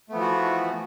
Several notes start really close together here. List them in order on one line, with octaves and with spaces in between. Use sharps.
A3 B3 F3 E3 F#4